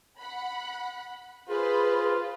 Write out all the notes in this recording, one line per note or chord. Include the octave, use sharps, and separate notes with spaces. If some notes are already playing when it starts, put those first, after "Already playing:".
F#5 B5
F4 G#4 B4 C5